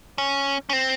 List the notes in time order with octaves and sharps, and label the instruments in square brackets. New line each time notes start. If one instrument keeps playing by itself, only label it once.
[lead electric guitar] C#4
C#4
C4